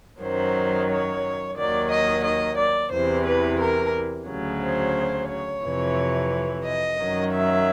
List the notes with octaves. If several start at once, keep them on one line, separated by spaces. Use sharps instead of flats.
F#2 D#3 F#3 C5
C#5
D#2 D#3 F#3 D5
D#5
D#5
D5
E2 C3 E3 C5
B4
A#4
D2 C#3 F#3
C5
C#5
F2 C3 E3
D#5
F#2 D#3 F#3
E5